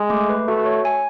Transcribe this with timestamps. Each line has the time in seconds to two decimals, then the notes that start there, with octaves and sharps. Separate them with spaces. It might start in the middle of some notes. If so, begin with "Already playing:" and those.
Already playing: G#3
0.10 A3
0.29 B4
0.47 A3 F#4
0.66 C#5
0.85 G#5